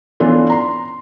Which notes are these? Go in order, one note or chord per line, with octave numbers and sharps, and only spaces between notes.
E3 B3 C#4 D4 F4 A4
A#5 C6